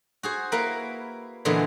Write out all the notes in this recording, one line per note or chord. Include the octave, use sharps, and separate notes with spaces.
F#4 G#4 C5
A#3 E4 A#4 B4
A#2 D3 E3 G#3 B3